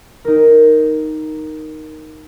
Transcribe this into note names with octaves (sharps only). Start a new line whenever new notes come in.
D#4 A#4